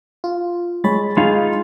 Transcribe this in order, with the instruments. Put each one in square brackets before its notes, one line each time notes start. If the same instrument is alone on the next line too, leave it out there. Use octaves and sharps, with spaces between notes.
[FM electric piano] F4
[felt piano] G#3 [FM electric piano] C#5 B5 A6
[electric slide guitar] G#3 D#4 F4 [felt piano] G#4 F5 C6